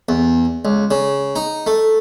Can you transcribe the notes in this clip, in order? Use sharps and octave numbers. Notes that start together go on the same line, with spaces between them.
E2
C#2
C#3
D#4
A3